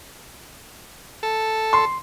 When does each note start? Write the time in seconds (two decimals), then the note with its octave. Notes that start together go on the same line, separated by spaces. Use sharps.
1.23 A4
1.73 C6